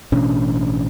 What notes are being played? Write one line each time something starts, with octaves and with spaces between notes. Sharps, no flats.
A1 B2 C#4 D4